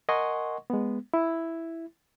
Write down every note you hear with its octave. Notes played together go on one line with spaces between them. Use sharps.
A#4 D#5 F#5 G#5 C6 C#6
G#3 B3
E4